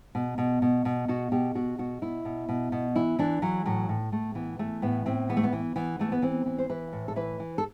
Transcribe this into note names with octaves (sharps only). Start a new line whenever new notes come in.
B2
B2
B2
B2
B2 F#4
B2 G4
B2 F#4
B2 F#4
B2 E4
B2
B2
B2
E3 E4
E3 D4
E3 F#3
A2 F#3
A2
A2 A3
E3 B3
E3 A3
A2 B3
A2 C4
E3 B3
A3
B3
E3
E3 B3
E3 A3
B3
E3 C4
E3
C5
E3 B4
A2
A4
E3 B4
E3
A4